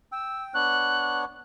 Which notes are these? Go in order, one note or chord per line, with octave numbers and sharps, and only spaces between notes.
G5 E6
B3 D4 C#5 F#6